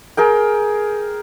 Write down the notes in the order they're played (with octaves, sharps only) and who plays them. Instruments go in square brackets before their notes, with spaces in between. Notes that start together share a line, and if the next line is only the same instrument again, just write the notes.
[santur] G#4 A#4 G5